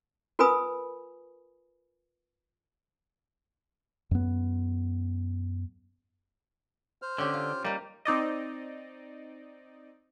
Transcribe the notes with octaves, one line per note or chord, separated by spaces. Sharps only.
F4 A#4 B4 G#5 B5 D#6
F#2 B3
C5 F6
D3 C#4 G4
F4
G3 A#3 D#4
C4 D#4 D5 D#5